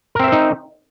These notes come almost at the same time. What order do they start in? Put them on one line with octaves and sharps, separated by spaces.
A#4 C4 E5 C5 D#4